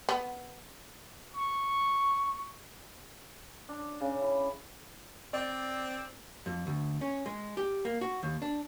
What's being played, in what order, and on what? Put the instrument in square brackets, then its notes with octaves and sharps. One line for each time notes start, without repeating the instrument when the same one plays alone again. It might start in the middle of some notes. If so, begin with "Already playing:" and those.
[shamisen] B3
[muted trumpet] C#6
[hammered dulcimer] D4
C#3
E4
[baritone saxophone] C4 [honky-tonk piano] D5
[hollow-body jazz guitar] F2
D2
C#4
G#3
G4
A#3
F#4
D#2
D4